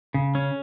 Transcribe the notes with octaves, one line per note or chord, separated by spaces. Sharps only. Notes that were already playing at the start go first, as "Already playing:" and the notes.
C#3
C#4